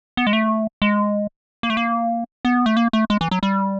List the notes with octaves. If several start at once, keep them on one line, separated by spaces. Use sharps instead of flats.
B3
G#3
A3
G#3
A#3
A3
A#3
B3
A3
A#3
A3
G#3
E3
F#3
G3